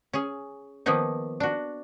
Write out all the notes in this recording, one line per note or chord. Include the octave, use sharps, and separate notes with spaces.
C#4 G#4
D#3 F3 A#3 B3 D#4
D4 F#4